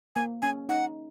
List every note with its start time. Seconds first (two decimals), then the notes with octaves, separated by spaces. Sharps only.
0.16 A#3 G#5
0.42 C#4 G#5
0.69 D#4 F#5